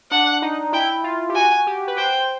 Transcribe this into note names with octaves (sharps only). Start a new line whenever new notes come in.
D4 F#5
D#4
E4 G5
F4
G4
F#4 G#5
G4
B4
C5 G5